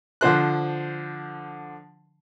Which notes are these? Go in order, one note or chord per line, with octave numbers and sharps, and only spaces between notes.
D3 F3 C5 F#6